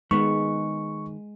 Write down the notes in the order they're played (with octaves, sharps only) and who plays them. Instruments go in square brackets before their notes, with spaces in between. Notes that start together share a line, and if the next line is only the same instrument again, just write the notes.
[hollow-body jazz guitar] D#3 B3 [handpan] G#3 [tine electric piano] C#6